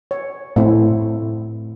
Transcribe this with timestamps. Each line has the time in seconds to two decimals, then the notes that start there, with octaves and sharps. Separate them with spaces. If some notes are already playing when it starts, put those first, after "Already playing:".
0.11 C#5
0.56 A2 A3 C4 E4